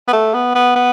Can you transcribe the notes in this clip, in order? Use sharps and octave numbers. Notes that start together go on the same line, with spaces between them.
B3
A3
B3
B3
B3